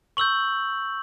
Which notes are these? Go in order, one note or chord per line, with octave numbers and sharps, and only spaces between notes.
C#6 E6 G6 F#7